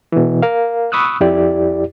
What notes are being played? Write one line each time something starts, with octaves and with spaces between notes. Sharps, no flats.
B2 E3
A#4 F5
B5 C#6 D#6 E6 F#6
F2 E4 G4 D5